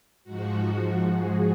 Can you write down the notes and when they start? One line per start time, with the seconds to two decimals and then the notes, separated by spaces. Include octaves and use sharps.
0.24 G#2 F3 F#4
1.13 G#4